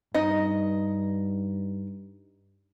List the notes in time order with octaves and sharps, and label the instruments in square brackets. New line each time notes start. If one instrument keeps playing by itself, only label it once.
[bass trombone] G2 [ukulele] D#4 D#5